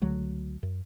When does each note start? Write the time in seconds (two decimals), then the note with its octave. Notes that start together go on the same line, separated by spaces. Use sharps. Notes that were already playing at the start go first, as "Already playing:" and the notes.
0.02 C#2 D3 F#3 A3
0.63 F#2